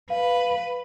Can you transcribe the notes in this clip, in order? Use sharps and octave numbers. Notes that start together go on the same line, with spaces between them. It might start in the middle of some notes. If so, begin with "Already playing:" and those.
B4 F5